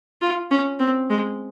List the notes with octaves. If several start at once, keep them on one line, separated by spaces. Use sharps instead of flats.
F4
C#4
C4
G#3